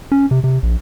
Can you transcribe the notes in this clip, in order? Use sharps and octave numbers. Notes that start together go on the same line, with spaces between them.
C#4
C3
C3
A#1